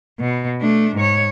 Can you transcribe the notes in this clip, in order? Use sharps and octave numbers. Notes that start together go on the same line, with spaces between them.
B2
A3 D4
G#2 C#5